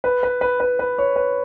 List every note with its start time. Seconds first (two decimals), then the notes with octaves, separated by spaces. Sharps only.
0.04 B4
0.23 B4
0.41 B4
0.60 B4
0.79 B4
0.98 C#5
1.16 B4